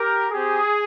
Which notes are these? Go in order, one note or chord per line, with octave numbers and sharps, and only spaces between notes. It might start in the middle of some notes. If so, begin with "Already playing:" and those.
Already playing: G4 A#4
C4 G4 G#4